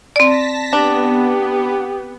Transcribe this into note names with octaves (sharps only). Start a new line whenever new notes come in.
C4 D5 A5 A#6 B6
B3 D4 G4